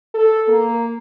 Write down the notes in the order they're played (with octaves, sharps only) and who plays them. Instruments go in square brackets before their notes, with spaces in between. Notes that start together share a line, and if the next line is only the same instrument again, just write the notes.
[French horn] A4
A#3